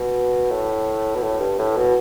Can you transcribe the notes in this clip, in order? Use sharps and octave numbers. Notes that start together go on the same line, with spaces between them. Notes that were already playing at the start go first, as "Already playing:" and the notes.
Already playing: B2
A2
B2
A2
G2
A2
B2